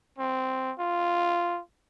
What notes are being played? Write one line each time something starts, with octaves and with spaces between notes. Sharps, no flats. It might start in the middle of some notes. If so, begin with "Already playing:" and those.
C4
F4